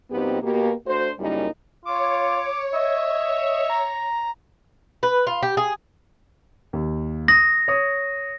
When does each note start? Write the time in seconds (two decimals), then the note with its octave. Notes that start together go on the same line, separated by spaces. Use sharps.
0.11 A#2 F#3 B3 C4 D#4 G4
0.42 B2 A#3 G4
0.87 A3 D4 F#4 C5
1.19 F#2 C#3 G3 A#3 D#4 E4
1.85 F4 C#5 D6
2.74 D#5 E5
3.70 A#5
5.03 B4
5.27 F4
5.42 G4
5.57 G#4
6.73 D#2
7.28 D#6 A#6
7.68 C#5 D#6